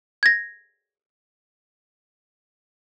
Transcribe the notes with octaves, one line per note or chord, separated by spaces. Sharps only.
G#6 A#6